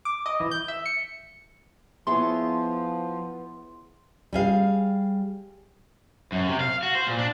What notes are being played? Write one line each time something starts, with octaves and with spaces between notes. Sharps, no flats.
D6
D#5
E3
G6
E5
C#7
F3 B3 E4 G#4 C#5 C6
G3 G#4 F5
F#2
C3
F5
F#4
C5
A#2
D4